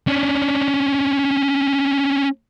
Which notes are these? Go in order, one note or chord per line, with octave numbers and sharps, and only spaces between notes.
C#4 D4